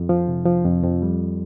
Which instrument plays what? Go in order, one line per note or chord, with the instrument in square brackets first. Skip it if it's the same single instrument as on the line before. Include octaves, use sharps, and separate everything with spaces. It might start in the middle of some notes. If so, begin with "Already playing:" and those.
Already playing: [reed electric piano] F2
F3
C3
F3
F2
F2
G3